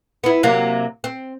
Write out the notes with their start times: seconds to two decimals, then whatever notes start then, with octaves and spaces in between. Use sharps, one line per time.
0.24 B3 E4
0.43 C3 F#3 A#3
1.04 C4